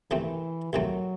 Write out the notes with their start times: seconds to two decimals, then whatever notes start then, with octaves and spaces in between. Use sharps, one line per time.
0.11 C2 C3 D#3 E3 A3 C4
0.73 C2 C3 D#3 F#3 A3 C4